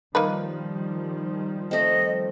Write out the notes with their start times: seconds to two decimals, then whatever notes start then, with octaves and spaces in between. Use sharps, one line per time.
0.15 D#3 F3 G3 A#3 D#4 B4
1.71 A3 C4 D#5